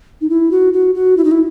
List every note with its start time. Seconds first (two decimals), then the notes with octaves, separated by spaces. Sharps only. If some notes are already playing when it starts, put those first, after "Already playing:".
0.21 D#4
0.30 E4
0.51 F#4
0.73 F#4
0.95 F#4
1.17 E4
1.24 D#4
1.31 E4